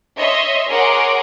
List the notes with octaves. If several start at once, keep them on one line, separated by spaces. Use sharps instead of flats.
C#5 D#5 E5 C6
G#4 A#4 C#5 F#5 C6 D6